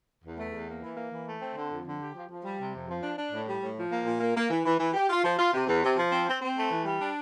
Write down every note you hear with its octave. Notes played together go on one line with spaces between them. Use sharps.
E2
A3
E2
A#3
E3
A#3
E3
A3
C4
D3
F2
D3
G4
F3
F3
G3
C3
F2
F3
D4
D4
A2
G3
A2
F3
A#3
A#2
A#3
A#3
E3
E3
E3
G4
F4
F3
F4
C3
E2
C3
F3
C4
C4
C4
A3
E3
G3
D4